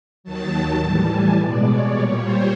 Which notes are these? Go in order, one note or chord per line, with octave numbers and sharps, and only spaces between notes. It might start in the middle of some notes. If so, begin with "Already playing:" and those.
D#2 D#3 F#3 A5
A2 E3 G3 A5
G#5
B2 G#3 D5
C#5
A#2 G3
C5